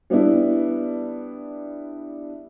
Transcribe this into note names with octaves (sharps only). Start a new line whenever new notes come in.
G3 B3 D4 E4